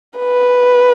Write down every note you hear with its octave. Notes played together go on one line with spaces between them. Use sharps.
B4